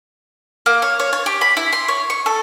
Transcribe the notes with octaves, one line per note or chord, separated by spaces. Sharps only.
A#3
C#5
C#5
C#5
G4
B5
E4
C6
C#5
C#6
A4